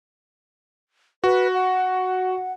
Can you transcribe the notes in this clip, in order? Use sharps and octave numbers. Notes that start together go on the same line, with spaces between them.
F#4 B4
F#5